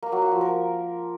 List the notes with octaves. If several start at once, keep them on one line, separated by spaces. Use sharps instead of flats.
A#3
F#3
F#4
F3
A#4